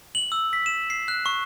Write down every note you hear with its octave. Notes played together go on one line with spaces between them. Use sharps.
F#7
E6
B6
E7
C7
F#6
C#6